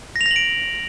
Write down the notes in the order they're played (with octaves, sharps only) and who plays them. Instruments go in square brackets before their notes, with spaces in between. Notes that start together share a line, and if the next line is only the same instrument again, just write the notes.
[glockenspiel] A#6
F7
A#6
F#7
D7